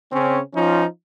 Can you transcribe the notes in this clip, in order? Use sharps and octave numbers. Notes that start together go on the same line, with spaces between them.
C#3 C4 C#4
F3 C#4 D#4 F4